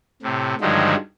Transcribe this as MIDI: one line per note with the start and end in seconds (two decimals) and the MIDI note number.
0.23 0.55 45
0.23 0.55 48
0.61 0.95 43
0.61 0.95 50
0.61 0.95 51
0.61 0.95 53
0.61 0.95 54
0.61 0.95 56